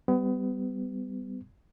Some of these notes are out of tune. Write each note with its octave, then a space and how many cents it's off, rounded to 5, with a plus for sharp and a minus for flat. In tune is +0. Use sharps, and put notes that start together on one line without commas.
G3 +0 B3 +35